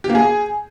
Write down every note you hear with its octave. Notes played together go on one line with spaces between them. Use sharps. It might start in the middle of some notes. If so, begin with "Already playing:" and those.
G4
A#3
G#4